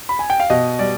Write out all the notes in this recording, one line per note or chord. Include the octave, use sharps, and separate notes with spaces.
B5
G#5
G5
F5
B2 D#5
G3 D5